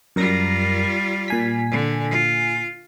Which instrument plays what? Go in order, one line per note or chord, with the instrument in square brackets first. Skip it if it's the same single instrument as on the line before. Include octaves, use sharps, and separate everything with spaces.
[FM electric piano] F#2 A#4 A#6 [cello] G3 F4
[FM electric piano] A#2 G#5 B6
[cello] D3
F4